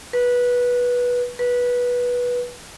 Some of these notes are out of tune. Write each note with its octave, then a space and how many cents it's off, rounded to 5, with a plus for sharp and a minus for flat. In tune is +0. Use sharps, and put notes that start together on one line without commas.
B4 -15
B4 -15